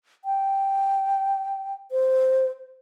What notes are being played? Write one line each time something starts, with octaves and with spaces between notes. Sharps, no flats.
G5
C5